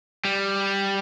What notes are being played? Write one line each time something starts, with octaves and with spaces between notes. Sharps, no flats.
G3